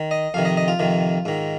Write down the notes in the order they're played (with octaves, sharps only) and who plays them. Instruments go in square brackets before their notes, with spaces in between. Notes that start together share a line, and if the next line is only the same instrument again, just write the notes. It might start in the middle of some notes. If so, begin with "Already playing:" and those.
Already playing: [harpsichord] D#3
D#5
F2 C3 D#3 F5
D#5
D#5
F4
F2 C3 D#3
G#2 D#3